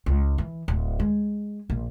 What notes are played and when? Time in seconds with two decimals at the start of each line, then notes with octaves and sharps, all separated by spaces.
0.06 C#2
0.38 E3
0.68 D1
1.00 G#3
1.70 A#1